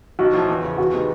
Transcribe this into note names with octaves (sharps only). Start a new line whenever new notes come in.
B1 F#4
A2 F3
E2
C#3 F3
E2 F#4
C3 D#3 G#3 B3